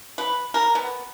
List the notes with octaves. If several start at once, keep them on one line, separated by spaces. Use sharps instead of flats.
B4
A#4
B3